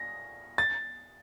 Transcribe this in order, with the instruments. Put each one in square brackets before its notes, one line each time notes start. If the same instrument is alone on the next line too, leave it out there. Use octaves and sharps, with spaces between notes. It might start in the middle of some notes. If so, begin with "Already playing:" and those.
Already playing: [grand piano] A#6
A6